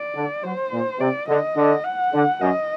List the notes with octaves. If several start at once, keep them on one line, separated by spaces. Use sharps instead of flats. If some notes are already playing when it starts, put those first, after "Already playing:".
Already playing: D5
D3
F#3 C5
A#2
C3 D5
D3 D#5
D3
F#5
D3
F#2 D#5